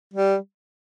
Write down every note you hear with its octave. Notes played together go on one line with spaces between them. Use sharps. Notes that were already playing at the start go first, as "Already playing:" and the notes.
G3